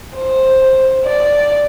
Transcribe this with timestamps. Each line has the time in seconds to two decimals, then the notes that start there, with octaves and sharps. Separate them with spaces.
0.17 C5
1.06 D5